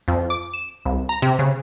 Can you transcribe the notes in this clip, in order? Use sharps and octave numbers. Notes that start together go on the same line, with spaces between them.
F2
D6
E7
C2
A#5
C3
C#3